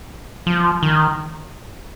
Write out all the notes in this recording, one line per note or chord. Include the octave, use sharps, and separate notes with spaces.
F3
D#3